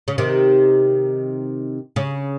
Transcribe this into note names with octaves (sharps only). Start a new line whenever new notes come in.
C#3
C3 D#3
C#3